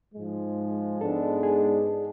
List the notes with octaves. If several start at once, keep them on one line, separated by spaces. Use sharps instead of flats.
G#2 F3 G#3
G#2 G#3 B3 D4 A4
G#4